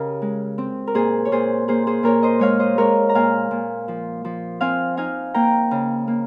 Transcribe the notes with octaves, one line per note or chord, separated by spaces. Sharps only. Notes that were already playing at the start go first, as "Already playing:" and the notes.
Already playing: C#3 G4 A#4 D#5 F5
G#3
C4
A#4
A#2 G#4 C5
C#5
A#2 G#4 C5
A#3 G#4 C5
G#4 C5
A#2 A#4 C#5
C5 D#5
G#3 C#5 F5
C5 D#5
G#3 A#4 C#5
A#5
A#2 F5 G#5
A#2
F3
F3
C4 F5 G#5
D#4 F5 G#5
A#3 G5 A#5
C#3
A#3